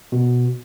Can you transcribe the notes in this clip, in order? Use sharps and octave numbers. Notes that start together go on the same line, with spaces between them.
B2